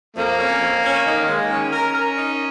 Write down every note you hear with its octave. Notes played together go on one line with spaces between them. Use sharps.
F2 A#3
C#4
F2
C#4
D#3
G#3
D#3 C#4
A#4
A#4
D#4